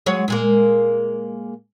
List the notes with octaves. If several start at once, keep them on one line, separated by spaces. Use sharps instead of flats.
F#3 G#3 C#5
A#2 G#3 A#3